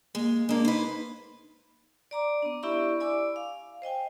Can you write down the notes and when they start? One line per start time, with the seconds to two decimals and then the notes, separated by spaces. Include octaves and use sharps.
0.15 G#3 A#3
0.49 G#3 A#3 D4
0.65 D#4 B4 C5
2.11 D5 A#5 D6
2.42 B3 D4
2.63 E4 G4 D5 E5 B5 C#6
3.00 D5 G#5 B5 D6 E6
3.36 F5
3.82 C5 D#5 G5 G#5